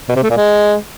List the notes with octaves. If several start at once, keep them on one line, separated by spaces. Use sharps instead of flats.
B2
C3
A3
A#2
G#3